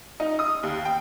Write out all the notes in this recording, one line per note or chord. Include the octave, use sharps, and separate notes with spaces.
D#4
D#6
D#2
G5